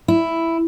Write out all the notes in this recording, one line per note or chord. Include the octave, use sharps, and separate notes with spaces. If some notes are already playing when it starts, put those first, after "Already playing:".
E4